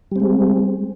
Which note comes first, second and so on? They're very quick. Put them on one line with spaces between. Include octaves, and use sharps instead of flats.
G3 C4 G#3